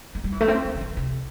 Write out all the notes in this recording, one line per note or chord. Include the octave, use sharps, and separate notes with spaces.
A3
G3
E3
A3
C4
A3
D3
E3
C3